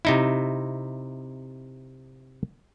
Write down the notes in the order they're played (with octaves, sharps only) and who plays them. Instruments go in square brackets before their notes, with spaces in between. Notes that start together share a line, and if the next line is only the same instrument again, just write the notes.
[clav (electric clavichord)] C3 D#4 E4